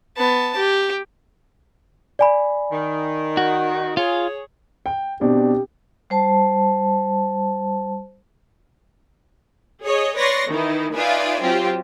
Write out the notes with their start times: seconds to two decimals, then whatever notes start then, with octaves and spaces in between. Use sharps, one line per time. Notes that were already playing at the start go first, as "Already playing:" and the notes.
0.17 B3 A5
0.56 G4
2.19 D5 G#5 B5
2.72 D#3
3.37 F#4
3.97 F4 G#4 C#5
4.86 G5
5.21 B2 C4 D4 G4
6.10 G3 C5 A5
9.83 G#4 C#5 D#5
10.16 B4 C#5 D5 C6 C#6 A#6
10.48 D#3 E3 D#4 E4
10.95 D#4 F4 B4 D5 E5 G#5
11.41 F#3 C4 F4 G4